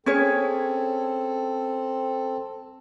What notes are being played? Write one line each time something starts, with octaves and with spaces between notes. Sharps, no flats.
C4 C#4 G#4 A4 C#5